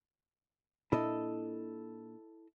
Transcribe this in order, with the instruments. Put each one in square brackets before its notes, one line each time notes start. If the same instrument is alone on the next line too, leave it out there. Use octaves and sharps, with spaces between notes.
[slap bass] A#2 C#4 D4 [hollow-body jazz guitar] E4 A4 D#5